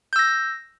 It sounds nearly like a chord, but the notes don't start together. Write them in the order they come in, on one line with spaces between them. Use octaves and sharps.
G6 E6 A#6